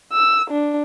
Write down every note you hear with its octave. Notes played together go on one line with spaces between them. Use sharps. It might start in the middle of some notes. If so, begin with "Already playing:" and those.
E6
D4